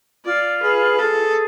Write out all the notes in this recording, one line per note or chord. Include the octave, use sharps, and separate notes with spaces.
F4 D5
G#4 B4
G#4 A4